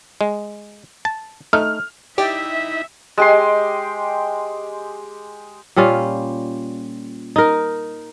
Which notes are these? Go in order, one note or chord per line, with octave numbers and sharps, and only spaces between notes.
G#3
A5
A3 D#4 F6
D#4 E4 G4 D5 E5 G5
G#3 G4 C6
A#2 G3 C#4 F4
D#4 A#4